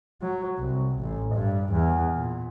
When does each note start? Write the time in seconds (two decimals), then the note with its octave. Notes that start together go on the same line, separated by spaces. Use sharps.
0.22 F#3
0.58 C2
1.00 A1
1.34 G2
1.72 E2
2.15 A#2